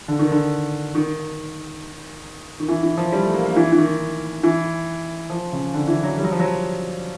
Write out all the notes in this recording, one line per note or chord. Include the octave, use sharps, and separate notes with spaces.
D3
D#3
D3
D#3
D#3
E3
E3
F3
G3
A3
A#3
A#3
E3
E3
D#3
E3
F3
C#3
D3
E3
F#3
G3
F#3
F3
F#3